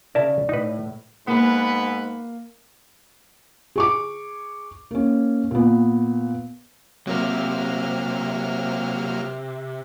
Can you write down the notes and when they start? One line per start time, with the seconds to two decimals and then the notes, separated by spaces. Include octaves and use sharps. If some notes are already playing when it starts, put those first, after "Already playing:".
0.15 C#3 A#4 D5 E5 A5
0.49 A2 D#4 B4
1.28 G#2 A#3 B3 B4
3.76 G#4 C#6 D6
4.91 A#3 C#4
5.51 A#2 B3
7.07 C3 F#3 A#3 F6